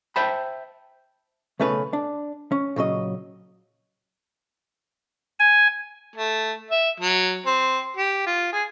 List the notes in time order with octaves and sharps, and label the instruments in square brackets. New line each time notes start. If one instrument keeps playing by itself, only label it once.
[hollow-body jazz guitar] C5 E5 G5 A5 B5
B1 C#3 A3 C#4 B4
D4
C#4
A#2 C#3 F#3 D#5
[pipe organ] G#5
[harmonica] A3
E5
F#3
C4
G4
F4
G#4